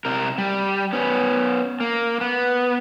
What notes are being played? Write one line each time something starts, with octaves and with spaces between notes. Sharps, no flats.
C3 A#4
G3
B3 C#4
A#3
B3